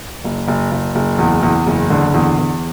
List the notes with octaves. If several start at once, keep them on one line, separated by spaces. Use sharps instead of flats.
F#1
F#1
F#1
F#1
E2
E2
F#1
D3
E2
E2